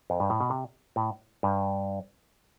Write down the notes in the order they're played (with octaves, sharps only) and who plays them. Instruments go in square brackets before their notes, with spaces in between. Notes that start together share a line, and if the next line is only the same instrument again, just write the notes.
[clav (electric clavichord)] F2
G2
A2
B2
C3
A2
G2